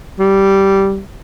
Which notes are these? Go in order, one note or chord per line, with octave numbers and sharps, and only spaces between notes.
G3